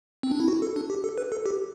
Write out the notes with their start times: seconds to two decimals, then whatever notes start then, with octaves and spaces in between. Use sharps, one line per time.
0.23 C4
0.31 D4
0.40 E4
0.48 F#4
0.62 A4
0.76 D4
0.90 G4
1.04 A4
1.18 B4
1.32 A4
1.46 G4